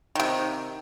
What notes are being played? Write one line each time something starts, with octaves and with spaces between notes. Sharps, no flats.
C3 D#3